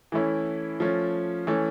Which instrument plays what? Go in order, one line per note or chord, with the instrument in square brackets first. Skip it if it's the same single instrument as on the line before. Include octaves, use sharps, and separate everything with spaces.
[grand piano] E3 A3 C#4 E4
F3 A3 C#4
E3 A3 C#4